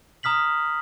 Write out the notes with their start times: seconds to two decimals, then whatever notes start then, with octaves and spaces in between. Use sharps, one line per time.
0.23 A#5 D#6 F6 B6 F#7